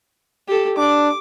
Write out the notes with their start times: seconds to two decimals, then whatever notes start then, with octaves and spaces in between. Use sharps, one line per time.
0.48 G4 A4
0.78 D4 D6